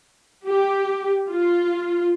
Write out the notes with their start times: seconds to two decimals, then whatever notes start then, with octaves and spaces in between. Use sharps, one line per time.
0.47 G4
1.30 F4